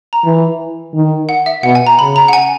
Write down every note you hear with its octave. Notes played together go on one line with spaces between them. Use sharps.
A#5
E3
D#3
F#5
E5
B2 F#5
G#5
A#5
C#3 B5
A#5
F#5
G#5